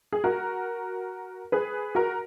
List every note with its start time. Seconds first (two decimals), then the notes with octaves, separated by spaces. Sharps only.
0.13 G#4
0.24 F#4 A#4
1.52 G#4 B4
1.95 F#4 A#4